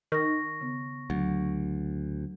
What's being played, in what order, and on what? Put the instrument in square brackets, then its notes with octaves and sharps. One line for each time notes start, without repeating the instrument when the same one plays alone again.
[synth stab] D#3 [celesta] C#6 A#6
[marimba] C#3 B3
[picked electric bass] D2 [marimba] F#3